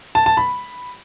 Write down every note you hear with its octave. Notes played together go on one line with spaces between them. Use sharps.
A5
A5
B5